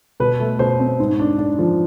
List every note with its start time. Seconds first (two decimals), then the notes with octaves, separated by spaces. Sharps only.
0.20 B2 B4
0.40 A3
0.59 B2 C5
0.80 C4
1.00 G#2
1.19 D4
1.39 D4
1.59 F3